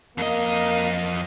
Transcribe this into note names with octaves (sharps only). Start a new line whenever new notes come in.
F2 A#3 D#5